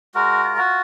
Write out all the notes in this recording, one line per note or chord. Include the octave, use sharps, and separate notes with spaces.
G#3 F#4 A#4
F4
F#4